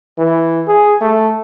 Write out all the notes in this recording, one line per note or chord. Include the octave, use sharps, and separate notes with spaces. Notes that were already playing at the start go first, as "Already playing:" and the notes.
E3
G#4
A3